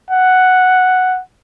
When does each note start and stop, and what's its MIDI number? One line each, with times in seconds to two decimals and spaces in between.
0.11 1.20 78